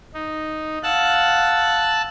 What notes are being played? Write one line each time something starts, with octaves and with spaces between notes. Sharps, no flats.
D#4
F5 F#5 A5 E6 F#6